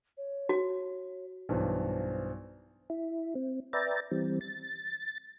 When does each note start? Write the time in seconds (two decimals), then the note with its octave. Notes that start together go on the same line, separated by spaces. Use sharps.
0.17 C#5
0.49 F#4
1.49 B1 G2 E3 C5
2.90 E4
3.35 C4
3.73 B4 D5 E5 G5 A#5 A6
4.11 E3 G3 C4
4.41 A6